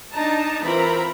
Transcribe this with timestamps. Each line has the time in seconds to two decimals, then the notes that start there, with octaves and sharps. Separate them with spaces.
0.12 D4 D#4 A5 A#5
0.62 E3 C4 F4 A#4 A#5 B5